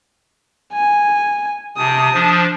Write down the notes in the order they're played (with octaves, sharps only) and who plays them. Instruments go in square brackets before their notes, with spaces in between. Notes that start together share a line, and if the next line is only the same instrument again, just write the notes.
[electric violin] G#5
[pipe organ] C3 [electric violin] A5 D#6
[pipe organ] F3 D4